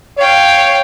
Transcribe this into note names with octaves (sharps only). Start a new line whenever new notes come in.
C#5 F5 G5